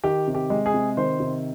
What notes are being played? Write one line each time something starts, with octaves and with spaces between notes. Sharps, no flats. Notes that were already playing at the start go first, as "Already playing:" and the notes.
D#3 G4
C3
G4
G#3
G#4
C3
D#3 C5
C3